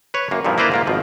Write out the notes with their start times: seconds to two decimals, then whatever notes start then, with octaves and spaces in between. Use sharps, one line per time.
0.14 B4 C#5
0.31 F#2 A#3
0.45 G2 A#2 F3 E4
0.58 A#3 E4 B4 C5 D5 A#5
0.72 G#2 A#3 F4
0.87 G#1 B2 F3